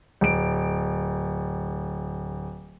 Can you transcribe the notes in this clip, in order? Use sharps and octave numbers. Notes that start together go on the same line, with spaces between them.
D1 D7